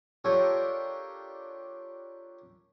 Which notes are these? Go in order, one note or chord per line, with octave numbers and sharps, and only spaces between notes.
D4 F4 G4 A4 A#4 C#5